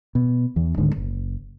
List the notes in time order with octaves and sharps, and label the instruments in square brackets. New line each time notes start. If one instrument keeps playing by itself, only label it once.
[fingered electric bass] B2
E2 E3
D1 G#2 D3 D#3
F#1